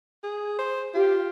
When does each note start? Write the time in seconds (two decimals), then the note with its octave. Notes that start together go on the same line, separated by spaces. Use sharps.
0.23 G#4
0.59 C5
0.95 F4 G4